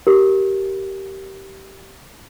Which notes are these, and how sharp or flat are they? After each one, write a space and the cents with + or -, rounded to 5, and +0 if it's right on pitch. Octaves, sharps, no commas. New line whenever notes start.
G4 -20 A#4 +0